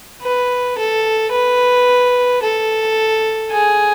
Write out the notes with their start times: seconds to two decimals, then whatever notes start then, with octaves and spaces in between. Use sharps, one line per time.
0.22 B4
0.78 A4
1.32 B4
2.42 A4
3.52 G#4